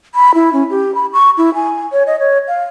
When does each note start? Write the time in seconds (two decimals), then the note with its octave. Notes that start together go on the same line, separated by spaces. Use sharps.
0.15 B5
0.34 E4
0.53 C#4
0.70 G4
0.95 B5
1.13 C#6
1.38 E4
1.54 G#5
1.92 C#5
2.07 D#5
2.19 C#5
2.48 F5